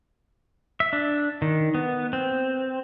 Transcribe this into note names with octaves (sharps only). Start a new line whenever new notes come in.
E5
D4
D#3
B3
C4